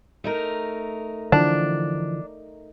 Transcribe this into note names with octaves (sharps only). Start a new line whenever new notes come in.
A3 D#4 A#4
D3 E3 F3 D4